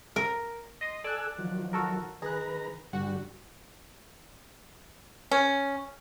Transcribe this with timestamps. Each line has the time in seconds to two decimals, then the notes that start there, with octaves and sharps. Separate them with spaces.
0.16 A#4
0.81 D#5 C6 D#6
1.04 A4 D5 G#5 E6 F#6
1.39 D#3 F3 F#3
1.73 F#4 A4 A#4
2.22 D#3 G#4 B4 A#5 F#6
2.93 G2 D3 G3 F#4 F#5
5.31 C#4